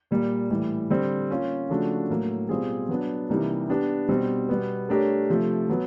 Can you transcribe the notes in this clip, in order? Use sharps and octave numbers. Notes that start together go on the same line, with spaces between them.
A#2 G3 A#3
A2 E3 G3
D3 G3 C4
A#3 C#4 F4
C#3 F3 A3 D4 F#4
A2 F#3 A#3
B2 G3 C4 F4 G#4
F#3 B3 D4
C3 E3 G3 A#3 D#4
B3 D4 G4
B2 G3 C4
B2 G3 B3
A3 D4 G4 A#4 C#5
C3 F3 A3
F#3 B3